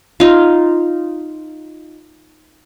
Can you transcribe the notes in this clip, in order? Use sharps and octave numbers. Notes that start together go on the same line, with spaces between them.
D#4 F4